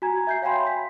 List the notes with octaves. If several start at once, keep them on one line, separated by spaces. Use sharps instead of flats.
F#4 G#5 A#5 G#6
E5 G6 C7
C#5 F5 G5 G#5 B5 C6
B5
B6